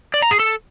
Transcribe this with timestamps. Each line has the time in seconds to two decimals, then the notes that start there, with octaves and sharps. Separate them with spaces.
0.14 D5
0.22 A#5
0.31 G#4
0.39 A4